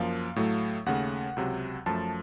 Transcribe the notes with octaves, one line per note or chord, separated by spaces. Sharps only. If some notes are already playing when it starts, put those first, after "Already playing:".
Already playing: F#2 F3 A#3 F5
A2 F#3 A3
D#2 C#3 A3 F#5
C#2 C3 F#3
F#2 F3 A3 A5